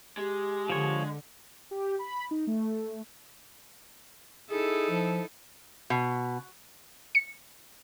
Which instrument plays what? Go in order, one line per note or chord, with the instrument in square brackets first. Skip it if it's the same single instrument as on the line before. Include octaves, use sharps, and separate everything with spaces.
[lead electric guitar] G#3 [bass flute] G4
[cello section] D3 [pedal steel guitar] F3 C#5
[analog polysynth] G4
B5
D#4
A3
[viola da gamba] D#4 E4 A4 [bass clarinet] G#4
[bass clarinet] F3
[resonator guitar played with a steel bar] B2
[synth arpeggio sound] C#7